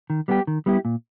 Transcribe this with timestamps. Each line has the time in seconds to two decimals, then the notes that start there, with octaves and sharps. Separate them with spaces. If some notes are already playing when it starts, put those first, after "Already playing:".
0.10 D#3
0.28 G3 B3 E4 G4
0.47 D#3
0.66 G3 B3 E4 G4
0.85 A#2